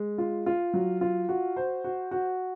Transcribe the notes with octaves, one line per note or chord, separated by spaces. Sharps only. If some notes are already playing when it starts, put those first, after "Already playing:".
Already playing: G#3
F4
F4
F#3
F4
F#4
C5
F#4
F#4